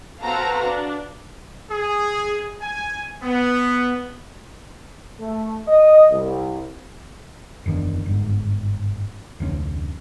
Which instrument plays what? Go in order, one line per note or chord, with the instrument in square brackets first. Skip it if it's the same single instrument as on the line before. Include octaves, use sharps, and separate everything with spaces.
[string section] C4 F#4 A4 B4 F5 A#5
D4
[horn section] G#4
G#5
B3
[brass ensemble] A3
D#5
C2
[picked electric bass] F#1 E2 D#3 D4
G1 G#2
F1 D2 C#4